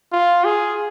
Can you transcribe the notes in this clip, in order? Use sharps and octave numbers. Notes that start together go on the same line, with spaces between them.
F4
G#4